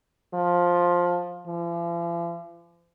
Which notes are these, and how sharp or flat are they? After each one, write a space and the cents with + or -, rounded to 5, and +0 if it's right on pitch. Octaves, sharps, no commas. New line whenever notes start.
F3 +10
F3 -45